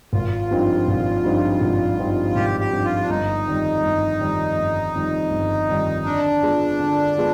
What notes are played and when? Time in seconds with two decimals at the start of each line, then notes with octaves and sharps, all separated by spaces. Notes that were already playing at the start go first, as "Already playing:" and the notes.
0.13 G#1 F4
0.51 G2 F3 C4 D#4
0.88 G#1
1.24 G2 F3 C4 D#4
1.61 G#1
1.98 G2 F3 C4 D#4
2.35 G#1 G4
2.60 G4
2.72 G2 F3 C4 D#4
2.85 F4
3.02 D4
3.09 G1 D#4
3.46 F2 D#3 G3
3.83 G1
4.20 F2 D#3 G3
4.58 G1
4.95 F2 D#3 G3
5.31 G1
5.68 F2 D#3 G3
6.05 D3 D4
6.42 G#3 B3 F4
6.80 D3
7.17 G#3 B3 F4